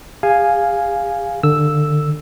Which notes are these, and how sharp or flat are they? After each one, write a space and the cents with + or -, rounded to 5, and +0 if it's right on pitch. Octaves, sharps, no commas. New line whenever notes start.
G#4 -45 F5 +0 G#5 +0
D3 +25 E6 +0